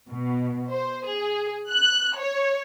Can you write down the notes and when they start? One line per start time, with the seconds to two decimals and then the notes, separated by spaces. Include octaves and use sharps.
0.10 B2
0.71 C5
1.07 G#4
1.71 F#6
2.18 C#5